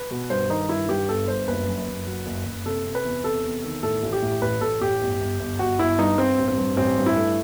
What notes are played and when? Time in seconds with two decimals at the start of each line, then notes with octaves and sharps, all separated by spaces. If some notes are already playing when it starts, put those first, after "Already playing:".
Already playing: B4
0.11 B2
0.30 G2 C5
0.49 D#3 D#4
0.69 G2 E4
0.89 G2 G4
1.09 G1 A4
1.28 G2 C5
1.48 F#1 B4
1.67 F#2
1.87 F#1
2.07 F#3
2.26 F#1
2.46 F#1
2.66 C3 A4
2.85 C3
2.95 B4
3.05 E2
3.24 C3 A4
3.44 E2
3.64 D#3
3.83 A2 A4
4.03 A1
4.13 G4
4.22 A2
4.42 A1 B4
4.61 A1 A4
4.81 A1 G4
5.01 G1
5.20 G1
5.39 G1
5.59 G1 F#4
5.79 G1 E4
5.99 G2 D#4
6.18 G2 C4
6.38 A1
6.48 C4
6.58 G2
6.77 A1 C4
6.97 G2
7.06 E4
7.17 A3